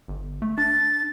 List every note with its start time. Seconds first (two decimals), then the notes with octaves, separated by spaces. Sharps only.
0.08 G1
0.42 A3
0.58 D4 A6